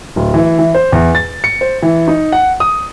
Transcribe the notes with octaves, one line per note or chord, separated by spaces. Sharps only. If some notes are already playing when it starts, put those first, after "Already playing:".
D1
E3
E3
C5
E2
A6
C#7
C5
E3
D#4
F#5
D#6